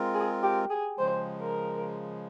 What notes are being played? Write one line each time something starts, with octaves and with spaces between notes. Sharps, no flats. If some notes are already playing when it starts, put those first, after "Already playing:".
Already playing: G#3 C4 F4 A#4
G#4
G4
G#4
C#3 F3 G#3 C5
A#4